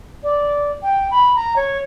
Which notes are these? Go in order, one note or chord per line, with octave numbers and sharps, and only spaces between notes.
D5
G5
B5
A#5
C#5